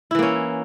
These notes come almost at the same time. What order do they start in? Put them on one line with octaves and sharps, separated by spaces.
E4 E3 A#3 C#4